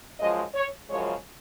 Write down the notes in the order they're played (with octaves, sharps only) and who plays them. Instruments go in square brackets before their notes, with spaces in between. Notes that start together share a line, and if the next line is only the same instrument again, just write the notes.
[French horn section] F#2 F3 G#3 D#5
C#5
F#2 C#3 F3 G#3 C#5